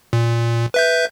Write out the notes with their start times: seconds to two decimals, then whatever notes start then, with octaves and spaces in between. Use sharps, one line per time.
0.13 A#2
0.74 B4 E5 G6